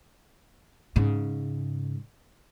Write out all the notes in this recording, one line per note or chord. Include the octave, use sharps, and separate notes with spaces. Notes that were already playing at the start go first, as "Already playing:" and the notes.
G#2 C#3